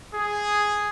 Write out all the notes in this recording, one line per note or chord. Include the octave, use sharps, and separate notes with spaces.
G#4